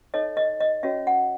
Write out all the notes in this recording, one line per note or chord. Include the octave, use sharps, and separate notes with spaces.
D#4 A4 C#5 D#5
D#5
D#5
C#4 F#4 C#5 E5
F#5